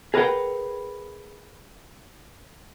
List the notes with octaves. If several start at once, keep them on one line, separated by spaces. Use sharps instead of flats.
G#4 A#4 B4 D5 F#5 G5